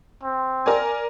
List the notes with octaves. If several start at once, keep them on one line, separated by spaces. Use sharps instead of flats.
C4
A#4 D5 G#5